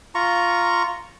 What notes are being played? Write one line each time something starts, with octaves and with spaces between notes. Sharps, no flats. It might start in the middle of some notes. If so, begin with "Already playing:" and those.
F4 A#5 C#6